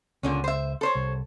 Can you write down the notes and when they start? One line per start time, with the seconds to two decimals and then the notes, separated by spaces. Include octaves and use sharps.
0.23 C#2 A#2 D3 C#4
0.44 C5 E5
0.81 A4 C5 C#5
0.95 C2